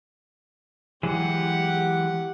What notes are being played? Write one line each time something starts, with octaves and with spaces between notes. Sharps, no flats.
E3 F#3 G#3 G4 F#5